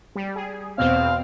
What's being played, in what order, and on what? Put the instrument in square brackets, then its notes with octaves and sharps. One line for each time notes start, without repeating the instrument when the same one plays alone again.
[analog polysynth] G3
G#4
[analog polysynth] E2 B2 C4 [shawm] F5